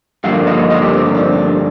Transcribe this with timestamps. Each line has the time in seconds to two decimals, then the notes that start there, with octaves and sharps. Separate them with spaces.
0.24 G2 D3 F3 A#3 F5
0.47 D#5
0.70 D#5
0.82 G4
0.94 C4
1.04 D#4
1.15 D4
1.23 C4
1.32 D4